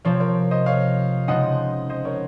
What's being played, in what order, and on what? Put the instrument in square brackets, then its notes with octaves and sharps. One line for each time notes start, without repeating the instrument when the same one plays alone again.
[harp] C3 F3 C4 [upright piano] C#5 F5
[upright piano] A#4 C#5
C5 D#5
C#5 F5
[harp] C#3 F3 G#3 C4 D#4 [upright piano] D#5 F#5
[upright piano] C5 D#5
A#4 C#5